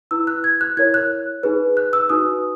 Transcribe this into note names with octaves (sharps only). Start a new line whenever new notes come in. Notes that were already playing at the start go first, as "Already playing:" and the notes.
E4 B4 E6
F#6
G#6
F#6
E4 A#4 C#5 G#6
F#6
D#4 G#4 B4
F#6
E6
D#4 F#4 B4 D#6